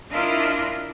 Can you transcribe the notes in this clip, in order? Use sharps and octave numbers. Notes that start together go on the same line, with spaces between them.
D4 E4 F4 A#4 D#5